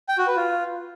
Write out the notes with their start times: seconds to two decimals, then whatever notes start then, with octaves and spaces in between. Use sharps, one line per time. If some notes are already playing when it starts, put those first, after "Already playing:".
0.09 G5
0.18 F#4
0.27 B4
0.36 F4